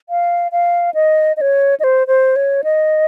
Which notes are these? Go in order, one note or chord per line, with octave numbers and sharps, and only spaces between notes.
F5
F5
D#5
D#5
C#5
D#5
C5
C5
C#5
D#5